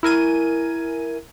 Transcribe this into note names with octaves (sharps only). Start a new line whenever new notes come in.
E4 A#4 G#5 D#7